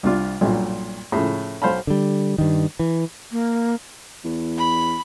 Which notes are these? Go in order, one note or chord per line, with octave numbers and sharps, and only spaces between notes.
C2 D4 F4
B1 G2 A#2
A2 C#3 F3
B1 C5 F5 A5 B5
D3 G3
G2 D#3
E3
A#3
E2
B5